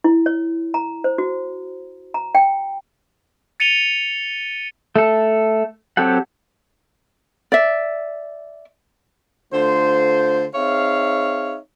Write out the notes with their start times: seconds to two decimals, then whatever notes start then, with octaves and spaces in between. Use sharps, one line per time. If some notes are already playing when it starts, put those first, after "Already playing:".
0.04 E4
0.26 C#5
0.74 A#5
1.04 C5
1.18 F#4
2.14 A#5
2.35 G5
3.60 A6 C#7 D#7 F7 G7
4.96 A3 A4
5.97 F#3 C4 G4 A4 F#5
7.52 D5 E5
9.53 D3 A3 F4 C5
10.54 C4 D#4 G#4 C#5 E5 F5